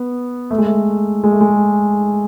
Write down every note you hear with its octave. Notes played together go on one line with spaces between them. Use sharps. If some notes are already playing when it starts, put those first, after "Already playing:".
Already playing: B3
A3
G#3
A3
G#3
A3
G#3